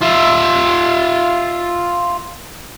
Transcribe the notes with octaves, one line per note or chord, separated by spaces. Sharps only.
F4 E5